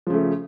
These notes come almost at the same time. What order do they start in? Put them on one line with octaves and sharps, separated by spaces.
F3 C#3 A3